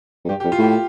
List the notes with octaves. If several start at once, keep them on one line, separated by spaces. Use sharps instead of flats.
F2
G2 G4
G4
F2
F4
A2 G4